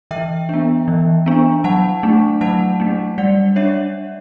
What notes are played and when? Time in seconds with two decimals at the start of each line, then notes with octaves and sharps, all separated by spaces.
0.11 E3 E5 G5
0.49 B3 D4
0.88 E3
1.26 B3 D4
1.64 F#3 F#5 A5
2.03 A3 D4
2.41 F#3 F#5 A5
2.80 A3 D4
3.18 G3 D5 F#5
3.56 D4 C#5 E5